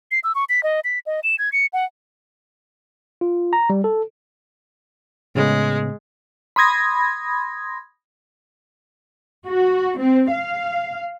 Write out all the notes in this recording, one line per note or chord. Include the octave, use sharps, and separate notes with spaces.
C7
E6
C#6
B6
D#5
B6
D#5
E7
G#6
C#7
F#5
F4
A#5
G3
A4
A2 C#3 G#3 B3
B5 C6 D#6 G#6 A#6
F#4
C4
F5